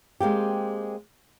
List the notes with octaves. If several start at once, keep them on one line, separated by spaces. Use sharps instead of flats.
G#3 A#3 C4 G4